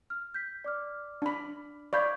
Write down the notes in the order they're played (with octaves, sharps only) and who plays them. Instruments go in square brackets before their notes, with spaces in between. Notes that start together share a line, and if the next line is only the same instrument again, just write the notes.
[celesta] F6
G6 B6
D5 D6 F6
[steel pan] D4 B5
[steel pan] D5 F5 B5 [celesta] C#6 G6 G#6